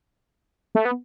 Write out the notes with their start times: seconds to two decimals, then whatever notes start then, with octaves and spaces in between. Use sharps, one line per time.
0.75 A3
0.85 B3